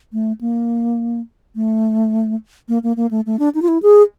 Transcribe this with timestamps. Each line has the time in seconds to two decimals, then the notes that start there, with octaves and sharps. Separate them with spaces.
0.13 A3
0.41 A#3
1.55 A3
2.68 A#3
2.83 A#3
2.97 A#3
3.11 A3
3.26 A3
3.39 D4
3.55 D#4
3.62 F4
3.68 E4
3.82 G#4